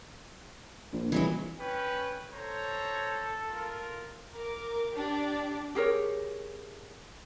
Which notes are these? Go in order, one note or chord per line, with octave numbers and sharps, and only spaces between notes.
A#1
C2 E3 F#3 G#3
C#4 B4 G5
A4 C5 C#5 A#5
F4 A#4
A#4 D6
D4 G4 D5
G4 G#4 A#4 C#5